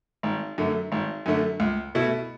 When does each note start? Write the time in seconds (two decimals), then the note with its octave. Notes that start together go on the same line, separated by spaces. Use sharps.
0.23 G#1
0.58 F#2 D3 A3
0.92 G#1
1.26 F#2 D3 A3
1.60 C#2
1.95 B2 A3 E4